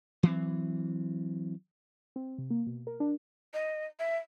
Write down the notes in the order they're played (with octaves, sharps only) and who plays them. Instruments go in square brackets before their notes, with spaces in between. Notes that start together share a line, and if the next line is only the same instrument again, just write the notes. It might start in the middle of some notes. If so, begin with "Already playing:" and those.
[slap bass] E3 F#3 C4
[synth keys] C4
C3
A#3
B2
A#4
D4
[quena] D#5
E5